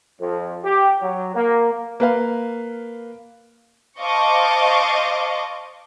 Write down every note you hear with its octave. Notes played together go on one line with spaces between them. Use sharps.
F2
G4
F#3
A#3
A#3 B4 F5
C5 D#5 F5 A5 C#6 D6